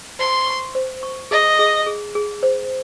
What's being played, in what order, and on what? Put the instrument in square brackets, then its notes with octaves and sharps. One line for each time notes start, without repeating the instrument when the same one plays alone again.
[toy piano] C5 [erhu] C6
[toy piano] C#6
C5
C#6
[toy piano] G#4 [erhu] D#5
[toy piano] G#4
G#4
G#4
C5